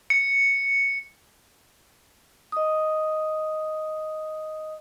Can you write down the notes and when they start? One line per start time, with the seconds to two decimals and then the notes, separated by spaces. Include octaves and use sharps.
0.10 C#7
2.52 D#5 D#6